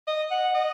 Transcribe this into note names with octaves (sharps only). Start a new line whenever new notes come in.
D#5
F#5
D#5